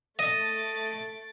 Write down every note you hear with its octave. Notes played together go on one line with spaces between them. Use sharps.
A3 D#5 A6 D7